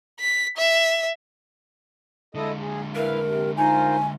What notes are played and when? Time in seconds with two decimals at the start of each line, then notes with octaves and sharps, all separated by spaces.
0.20 B6
0.57 E5
2.35 D3 G#3 E4 A4 D#5
2.60 G#4
2.95 E4 A#4 B4 F5
3.24 C3
3.58 D#4 F4 A#4 C5 G#5